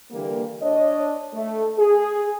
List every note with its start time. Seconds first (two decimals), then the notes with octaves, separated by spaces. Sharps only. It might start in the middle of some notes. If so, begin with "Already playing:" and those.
0.12 D3 E3 G3 A#3
0.62 D4 C#5 D#5
1.34 A3
1.78 G#4